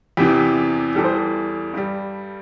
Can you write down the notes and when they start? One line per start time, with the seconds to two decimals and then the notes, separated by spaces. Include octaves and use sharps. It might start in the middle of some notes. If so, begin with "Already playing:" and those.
0.17 E2 C3 E3 G4
0.95 E2 E3 G3 A4
1.04 C5
1.13 A4
1.74 G2 G3